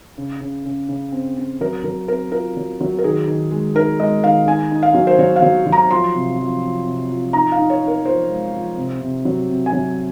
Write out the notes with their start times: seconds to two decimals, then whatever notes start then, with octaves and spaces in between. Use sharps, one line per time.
0.18 C#3
0.40 C#3
0.65 C#3
0.89 C#3
1.12 C4
1.37 C4
1.61 F#3 A#4
1.84 F#3 A#4
2.08 C4 A#4
2.32 F4 A#4
2.57 F#3
2.81 F#3
2.99 A#4
3.04 D#3 G#4
3.27 D#3
3.51 G#3
3.75 D#4 A#4
4.00 G#3 D#5
4.23 D#3 F5
4.47 D#4 G#5
4.72 D#4
4.83 F5
4.94 F#3
5.07 C5
5.19 F#3 C#5
5.36 F5
5.42 F#3
5.66 F#3
5.72 A#5
5.90 F3 C6
6.15 C3
6.38 F3
6.62 F3
6.86 C3
7.10 F3
7.33 D#4 A#5
7.52 F5
7.58 D#4
7.70 C#5
7.82 D#4
7.88 A#4
8.05 F3 C5
8.29 G#3
8.54 F3
8.77 C3
9.01 C3
9.25 F#3
9.49 C3
9.66 G#5
9.73 F#3